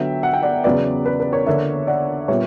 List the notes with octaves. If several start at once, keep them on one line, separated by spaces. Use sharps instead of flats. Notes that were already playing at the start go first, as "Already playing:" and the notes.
Already playing: D3 F#3 B3 E5 G5
F#5
G5
D5 F#5
E2 C#3 F#3 B4 D5
B4
B4
A#4 C#5
D3 A#3 D4 C#5 E5
D5 F#5
A#2 G3 B3 D4 C#5 E5